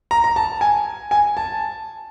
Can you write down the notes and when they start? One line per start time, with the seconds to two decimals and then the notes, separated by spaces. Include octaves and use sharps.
0.11 A#5
0.24 A#5
0.36 A5
0.61 G#5
1.11 G#5
1.37 A5